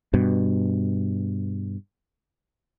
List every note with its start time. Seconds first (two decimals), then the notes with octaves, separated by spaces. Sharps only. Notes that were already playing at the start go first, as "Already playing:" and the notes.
0.14 G2 B2